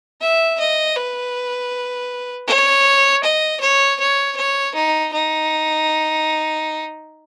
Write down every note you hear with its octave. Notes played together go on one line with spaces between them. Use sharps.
E5
D#5
B4
C#5
D#5
C#5
C#5
C#5
D#4
D#4